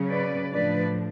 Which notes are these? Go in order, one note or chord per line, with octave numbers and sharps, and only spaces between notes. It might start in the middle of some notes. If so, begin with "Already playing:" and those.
Already playing: C#3 F#3 C#4
B4 D5
A2 F3 A3 D4 B4 D5